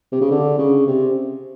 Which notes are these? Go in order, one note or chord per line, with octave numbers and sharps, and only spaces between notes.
C3
C#3
D3
C#3
C3